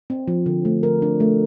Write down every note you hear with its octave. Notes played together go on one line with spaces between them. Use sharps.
C4
F3
D3
A3
A#4
D4
A3